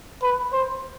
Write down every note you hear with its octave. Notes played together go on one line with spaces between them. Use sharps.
B4
C5